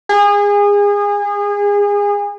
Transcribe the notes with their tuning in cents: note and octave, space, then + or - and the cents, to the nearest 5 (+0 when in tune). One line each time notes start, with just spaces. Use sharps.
G#4 -30